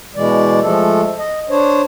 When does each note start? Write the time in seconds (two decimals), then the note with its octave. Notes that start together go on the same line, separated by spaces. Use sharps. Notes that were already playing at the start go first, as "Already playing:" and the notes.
0.16 B2 E3 G#3 D5
0.61 F3 G#3 A3 A4
1.18 D#5
1.50 D4 C5 C#5